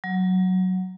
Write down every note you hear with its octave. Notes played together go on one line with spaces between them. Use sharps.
F#3